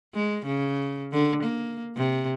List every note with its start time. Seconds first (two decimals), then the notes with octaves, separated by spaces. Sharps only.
0.14 G#3
0.46 C#3
1.13 D3
1.43 A#3
1.96 C3